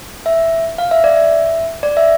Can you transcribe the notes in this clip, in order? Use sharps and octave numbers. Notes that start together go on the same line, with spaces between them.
E5
F5
E5
D5
E5
D5
E5